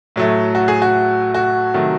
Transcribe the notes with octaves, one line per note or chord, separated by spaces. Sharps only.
A2 F#3 A3
F#4
G#4
F#4
F#4
C3 D#3 F#3 A3